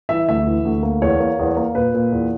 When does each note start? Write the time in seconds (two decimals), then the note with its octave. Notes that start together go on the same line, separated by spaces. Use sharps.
0.09 E3 E5
0.29 D2 E5
0.47 E3
0.65 D2
0.83 A#3
1.02 E2 C#5
1.20 A#3
1.39 E2
1.57 A#3
1.75 A#2 B4
1.94 A#2
2.12 E2